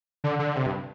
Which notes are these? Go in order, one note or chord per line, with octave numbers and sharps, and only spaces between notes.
D3
D3
C3
G2